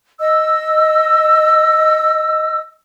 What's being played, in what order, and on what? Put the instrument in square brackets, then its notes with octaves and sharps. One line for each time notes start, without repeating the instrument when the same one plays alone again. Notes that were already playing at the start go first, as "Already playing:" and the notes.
[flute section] D#5 E6